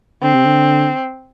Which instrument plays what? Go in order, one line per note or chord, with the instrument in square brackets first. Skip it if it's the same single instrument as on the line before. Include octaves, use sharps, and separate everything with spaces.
[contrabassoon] D3 [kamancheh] C4
[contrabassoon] C3
D3